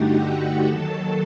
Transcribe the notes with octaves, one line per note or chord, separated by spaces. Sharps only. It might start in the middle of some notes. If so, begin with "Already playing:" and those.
Already playing: G2 D3 A3 D#4 F#4 G4 F#5 G5
D#2 D#3 F#3 A4 A5